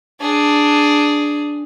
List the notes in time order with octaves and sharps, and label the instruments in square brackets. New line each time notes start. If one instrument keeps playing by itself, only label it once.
[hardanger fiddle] D4 G#4